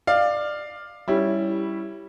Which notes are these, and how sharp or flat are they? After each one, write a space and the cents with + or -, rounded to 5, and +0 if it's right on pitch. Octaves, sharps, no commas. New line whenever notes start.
D5 +20 F5 +0
G3 +0 C#4 +0 E4 +0